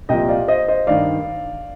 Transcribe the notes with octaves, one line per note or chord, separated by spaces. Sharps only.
C2 A#2 F3 D#5 G5
D5 F5
C5 D#5
C5 D#5
G2 D#3 D5 F5